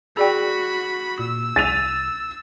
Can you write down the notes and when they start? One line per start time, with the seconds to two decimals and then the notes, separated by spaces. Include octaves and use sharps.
0.17 F#4 G#4 D5 G5 B5
1.19 A#2 E6
1.56 C2 A6 D#7 F7